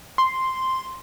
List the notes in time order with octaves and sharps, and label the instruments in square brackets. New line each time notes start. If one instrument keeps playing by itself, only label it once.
[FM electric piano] C6